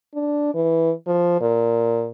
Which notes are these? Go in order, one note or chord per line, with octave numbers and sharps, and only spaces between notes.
D4
E3
F3
A#2